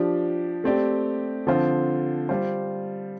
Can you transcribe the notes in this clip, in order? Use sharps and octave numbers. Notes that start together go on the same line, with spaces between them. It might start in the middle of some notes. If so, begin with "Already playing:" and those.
Already playing: F3 D4 G4
A3 C4 G4 D5
D3 F3 C4 F4 C5
G3 F4 C5